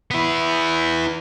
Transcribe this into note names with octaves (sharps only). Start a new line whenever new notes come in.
B3 E4